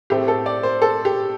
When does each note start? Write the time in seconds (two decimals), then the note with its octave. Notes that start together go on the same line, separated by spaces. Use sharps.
0.10 A2 A3 C4 G4
0.28 A4
0.46 D5
0.63 C5
0.82 A4
1.05 G4